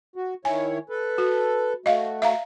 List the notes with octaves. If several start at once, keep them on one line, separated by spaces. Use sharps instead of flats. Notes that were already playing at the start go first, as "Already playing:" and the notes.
F#4
D#3 E4 C#5 G#5
A4 B4
F#4
A3 F#4 D#5 F5
E5 F5 A#5